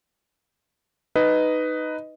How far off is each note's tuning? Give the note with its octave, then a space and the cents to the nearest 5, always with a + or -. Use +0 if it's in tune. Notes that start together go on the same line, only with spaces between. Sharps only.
D#4 +0 B4 +10 D#5 +0